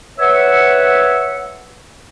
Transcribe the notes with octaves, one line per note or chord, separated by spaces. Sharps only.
B4 C#5 E5 F#5